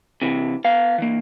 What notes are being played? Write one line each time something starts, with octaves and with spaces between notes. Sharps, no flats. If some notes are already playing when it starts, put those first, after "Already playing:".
C3 E3
B3 F5
E3 A#3